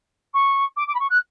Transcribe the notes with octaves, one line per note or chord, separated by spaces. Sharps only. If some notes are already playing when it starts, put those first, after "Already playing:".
C#6
D6
D6
B5
C#6
F#6